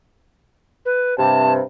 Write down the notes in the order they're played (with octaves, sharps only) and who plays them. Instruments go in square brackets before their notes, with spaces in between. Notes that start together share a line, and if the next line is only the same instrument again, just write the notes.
[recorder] B4
[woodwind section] G2 C3 [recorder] A5